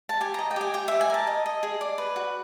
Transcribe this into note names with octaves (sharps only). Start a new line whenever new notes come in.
A5
G4 G#5
D#5 A#5
G5
G4 G#5
G4 G5
G4 E5
G#5
A#4 A5
D#5
D#5
G#4
D5
B4
F#4